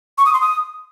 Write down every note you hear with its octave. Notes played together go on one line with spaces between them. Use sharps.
C#6
D#6
C6
D#6